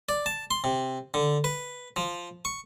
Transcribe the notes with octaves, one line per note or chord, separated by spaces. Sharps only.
D5
A5
C6
C3
D3
B4
F3
C#6